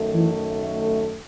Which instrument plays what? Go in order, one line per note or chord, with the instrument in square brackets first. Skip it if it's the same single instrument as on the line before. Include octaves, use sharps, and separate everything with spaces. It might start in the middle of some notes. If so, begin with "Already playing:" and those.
Already playing: [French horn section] F#2 D#3 A3
[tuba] E3